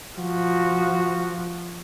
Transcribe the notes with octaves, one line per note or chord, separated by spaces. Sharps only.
F3 F#4